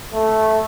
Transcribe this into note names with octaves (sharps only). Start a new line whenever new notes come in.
A3